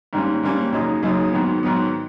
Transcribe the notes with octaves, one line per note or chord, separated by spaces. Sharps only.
G#2 D#3 G3 A#3 C#4
G#2 D#3 G3 A#3 C#4
F#2 C#3 F#3 A#3 D#4
F#2 C#3 F#3 A#3 D#4
G#2 D#3 F#3 B3
G#2 D#3 F#3 B3